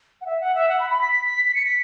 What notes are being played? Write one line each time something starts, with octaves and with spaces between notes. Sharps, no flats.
F#5
E5
F#5
E5
F#5
B5
B5
B6
B6
B6
B6
C#7
B6